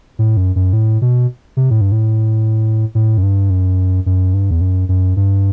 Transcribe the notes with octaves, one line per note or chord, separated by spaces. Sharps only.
A2
F#2
F#2
A2
B2
C3
A2
G2
A2
A2
F#2
G2
F#2
F#2
G2
E2
F#2
F#2
G2